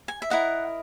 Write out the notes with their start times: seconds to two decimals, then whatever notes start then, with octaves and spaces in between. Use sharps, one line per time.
0.08 G#5
0.22 E5
0.30 E4 A#4 D#5 F#5